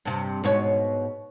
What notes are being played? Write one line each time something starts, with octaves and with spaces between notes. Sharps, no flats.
G2 C3
G#2 B2 C#5